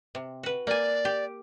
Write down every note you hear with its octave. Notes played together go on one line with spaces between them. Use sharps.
C3
F#4 B4
A#3 D5 G#5
G4